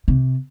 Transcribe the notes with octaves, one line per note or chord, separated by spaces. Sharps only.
C3